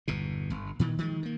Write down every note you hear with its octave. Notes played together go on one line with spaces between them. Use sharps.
G1 E2 B2
G1
A#2 D#3 E3
D#3 F3 G3 G#3
D#3 A#3